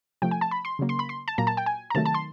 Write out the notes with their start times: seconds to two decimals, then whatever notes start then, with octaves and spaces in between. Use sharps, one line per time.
0.22 C3 F3 A3 G5
0.31 G#5
0.41 A5
0.51 B5
0.65 C6
0.79 C#3 F#3 A#3
0.89 C6
0.99 B5
1.09 C6
1.28 A5
1.38 A#2 F#3 A#3 A#5
1.47 A5
1.57 G5
1.66 G#5
1.90 A#5
1.95 C3 D#3 F#3 A3 A5
2.05 A5
2.14 C6